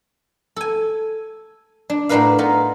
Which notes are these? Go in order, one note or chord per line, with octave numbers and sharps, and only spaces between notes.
A4 G#5
D4
A2 B3 D4 A#4 B4 F5
B3 D#4 F4 A#4